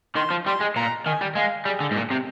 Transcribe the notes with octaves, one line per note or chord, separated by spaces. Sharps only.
D#3 C6
F3
G3 C6
G#3
A#2 A#5
D#3 G#5
G3
G#3 F5
G3 G#4
D3
G#2
A#2
C3